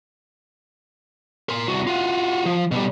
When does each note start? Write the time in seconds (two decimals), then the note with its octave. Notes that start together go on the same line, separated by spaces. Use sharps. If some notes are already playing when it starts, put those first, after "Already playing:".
1.49 A#4 C6
1.68 C2 F#4
1.87 F4 F#4
2.46 F3
2.71 B2 G3